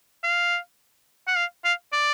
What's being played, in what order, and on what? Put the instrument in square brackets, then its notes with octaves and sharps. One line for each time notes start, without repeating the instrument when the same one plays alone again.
[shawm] F5
F#5
F5
F5
D5